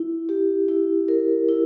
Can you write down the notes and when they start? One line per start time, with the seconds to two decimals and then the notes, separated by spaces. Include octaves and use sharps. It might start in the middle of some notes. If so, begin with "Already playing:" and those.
Already playing: E4
0.29 G4
0.68 E4
1.08 A#4
1.49 E4